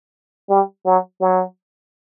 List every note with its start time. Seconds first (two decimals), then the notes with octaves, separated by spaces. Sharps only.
0.49 G3
0.86 F#3
1.21 F#3